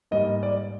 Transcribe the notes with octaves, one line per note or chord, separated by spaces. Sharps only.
G#2 G3 A#3 D#5
D5